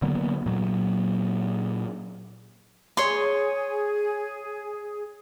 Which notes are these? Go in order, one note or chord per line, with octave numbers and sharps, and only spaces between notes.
D3 F#3 A#3 B3
A#2 F#3
G#4 C#5 C6